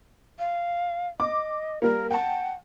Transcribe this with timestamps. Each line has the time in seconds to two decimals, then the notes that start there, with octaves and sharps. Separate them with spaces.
0.39 F5
1.20 D#5 D6
1.82 G3 A#3 A#4
2.11 F#5 G5 A5